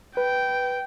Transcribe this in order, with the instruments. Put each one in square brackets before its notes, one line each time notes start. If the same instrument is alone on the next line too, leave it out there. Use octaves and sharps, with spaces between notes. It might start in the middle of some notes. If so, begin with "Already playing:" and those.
[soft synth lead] B4 [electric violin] G5